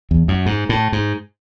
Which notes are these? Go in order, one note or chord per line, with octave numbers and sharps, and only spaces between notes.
E2
F#2
G#2
A2
G#2